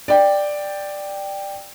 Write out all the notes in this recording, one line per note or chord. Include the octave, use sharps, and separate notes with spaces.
D5 G5